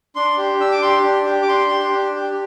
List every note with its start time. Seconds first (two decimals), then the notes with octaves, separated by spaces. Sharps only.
0.16 D4 C6
0.38 G4
0.60 D4 E6
0.71 D6
0.82 G4 C6
1.04 D4
1.26 G4
1.42 D6
1.48 D4 C6
1.71 G4
1.93 D4
2.16 G4